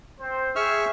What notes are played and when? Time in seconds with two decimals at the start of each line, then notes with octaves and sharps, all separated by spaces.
0.20 C4 C5
0.56 G#4 E5 C#6 E6 F6